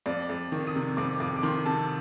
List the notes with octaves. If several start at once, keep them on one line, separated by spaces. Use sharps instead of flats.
F2 D5
F2
D#3
D#6
C3
F2 D6
F2 D6
D6
D#3 C6
C3 A5